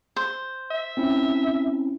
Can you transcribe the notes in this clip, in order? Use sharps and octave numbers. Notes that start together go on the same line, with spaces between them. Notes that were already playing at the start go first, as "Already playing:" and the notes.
C5
E5
C4 C#4 E4